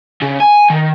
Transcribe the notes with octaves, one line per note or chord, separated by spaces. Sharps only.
C#3
G#5
D#3